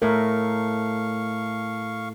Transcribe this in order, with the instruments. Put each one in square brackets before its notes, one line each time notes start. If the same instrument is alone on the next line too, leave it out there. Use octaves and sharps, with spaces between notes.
[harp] A2 [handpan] A#4 E5 [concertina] F5 C#6